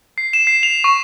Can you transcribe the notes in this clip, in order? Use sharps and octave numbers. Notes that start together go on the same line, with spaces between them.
C7
E7
C7
F7
C#6